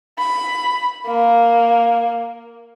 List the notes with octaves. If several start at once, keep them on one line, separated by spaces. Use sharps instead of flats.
B5
A#3